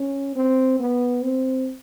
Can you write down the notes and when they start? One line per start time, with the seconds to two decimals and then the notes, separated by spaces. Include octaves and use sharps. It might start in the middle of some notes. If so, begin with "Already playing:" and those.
Already playing: C#4
0.35 C4
0.80 B3
1.23 C4